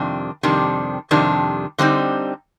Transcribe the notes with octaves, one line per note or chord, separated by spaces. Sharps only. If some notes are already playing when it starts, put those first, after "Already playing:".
Already playing: F2 C3 D#3 G3 D4
F2 C3 D#3 G3 D4
F2 C3 D#3 G3 D4
D3 G3 C4 D#4